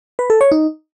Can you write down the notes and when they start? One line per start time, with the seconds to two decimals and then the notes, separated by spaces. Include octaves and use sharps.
0.19 B4
0.30 A4
0.41 C#5
0.52 D#4